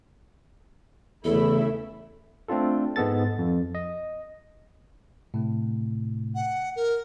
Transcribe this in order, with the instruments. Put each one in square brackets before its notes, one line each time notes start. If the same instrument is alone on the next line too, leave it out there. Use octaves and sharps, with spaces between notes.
[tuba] E2 [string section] C#3 A3 E4 [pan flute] A4
[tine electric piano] A3 C4 D4 F4 A4
G#2 G#3 B3 A4 A6
F2
D#5
A2 C3 A3
[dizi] F#5
A#4